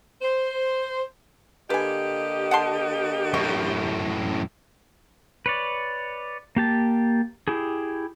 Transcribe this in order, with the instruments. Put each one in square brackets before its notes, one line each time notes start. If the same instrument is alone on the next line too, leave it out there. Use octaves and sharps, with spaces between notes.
[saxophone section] C5
[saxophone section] D3 A#3 G4 [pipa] B4 G#5 [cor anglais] D#5
[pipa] F#5 A5 C6
[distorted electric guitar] F#2 A2 [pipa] C#6
[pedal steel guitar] B4 C#5 D5
A#3 G4 A5
E4 G4 G#4